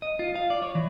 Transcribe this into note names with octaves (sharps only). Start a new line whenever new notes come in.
D#5
F4
F5
D5
C#5
E3